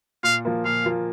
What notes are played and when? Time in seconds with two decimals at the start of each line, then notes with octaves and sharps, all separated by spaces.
0.23 A#2 F5
0.45 F3 A#3 F4
0.65 A#2 F5
0.85 F3 A#3 F4